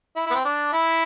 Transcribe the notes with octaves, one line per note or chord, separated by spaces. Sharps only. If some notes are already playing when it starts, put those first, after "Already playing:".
E4
B3 E4
C4
D4
E4